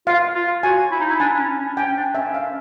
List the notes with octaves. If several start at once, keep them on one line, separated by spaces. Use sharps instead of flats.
F4 F5
F4
F#4 G#5
E4
D#4
E4
D4 G#5
C#4
C#4
C#4 G5
D4
C#4 E5
F5